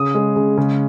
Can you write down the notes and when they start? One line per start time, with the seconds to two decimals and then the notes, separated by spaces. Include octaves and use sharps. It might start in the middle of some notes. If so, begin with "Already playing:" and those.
Already playing: C#3 D#6
0.15 G#3
0.36 C#3
0.58 C#3